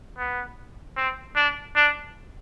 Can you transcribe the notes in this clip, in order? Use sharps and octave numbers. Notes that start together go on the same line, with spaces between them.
B3
C4
D4
D4